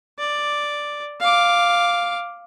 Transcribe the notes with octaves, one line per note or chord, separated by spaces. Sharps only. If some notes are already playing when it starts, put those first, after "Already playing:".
D5
F5 D6